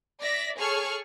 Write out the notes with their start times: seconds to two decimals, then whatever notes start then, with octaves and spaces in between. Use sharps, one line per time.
0.20 D5 E5 A#6 B6
0.57 G#4 A4 C#5 C#6 F6